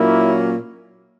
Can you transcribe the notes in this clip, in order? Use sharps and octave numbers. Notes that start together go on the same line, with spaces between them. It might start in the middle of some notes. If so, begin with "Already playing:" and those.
Already playing: A#2 F#3 A#3 C#4 E4